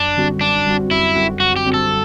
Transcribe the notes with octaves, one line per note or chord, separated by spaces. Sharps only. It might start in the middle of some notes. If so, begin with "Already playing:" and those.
Already playing: F#2 D4
D3 G3 C4 F#4
F#2 D4
D3 G3 C4 F#4
F#2 E4
D3 G3 C4 F#4
F#2 F#4
G4
D3 G3 C4 F#4
A4